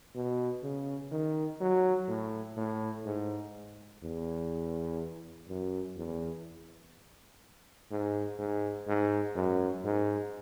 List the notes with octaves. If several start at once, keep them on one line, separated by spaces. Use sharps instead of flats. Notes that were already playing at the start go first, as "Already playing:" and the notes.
B2
C#3
D#3
F#3
A2
A2
G#2
E2
F#2
E2
G#2
G#2
G#2
F#2
G#2